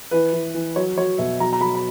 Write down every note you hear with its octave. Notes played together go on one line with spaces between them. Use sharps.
E3 B4
E3
E3
F#3 C#5
F#3 C#5
B2 E5
F#3 A#5
A#5
F#3 B5
B5